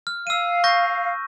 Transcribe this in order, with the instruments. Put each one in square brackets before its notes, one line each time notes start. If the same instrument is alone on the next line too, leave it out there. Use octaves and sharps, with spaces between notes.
[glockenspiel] F6
[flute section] F5 [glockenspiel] E6 D#7
[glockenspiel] C#6 G6 A#6